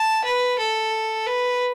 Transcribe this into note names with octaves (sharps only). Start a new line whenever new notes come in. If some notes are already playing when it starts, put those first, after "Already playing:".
Already playing: A5
B4
A4
B4